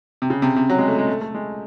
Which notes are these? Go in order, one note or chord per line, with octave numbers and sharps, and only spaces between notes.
C3
C#3
C3
C3
F#3
G#3
A3
G#3
A3
A3
G#3